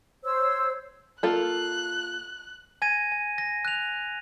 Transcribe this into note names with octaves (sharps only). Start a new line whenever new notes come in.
C5 C#5 E6
A#3 F4 A4 F#6
G#5 G#6 A#6 D#7
G#5
A#6
F#6 F7